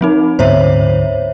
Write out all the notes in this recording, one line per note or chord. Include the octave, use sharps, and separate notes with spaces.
F3 C4 D#4
D2 G#2 B3 C5 C#5 E5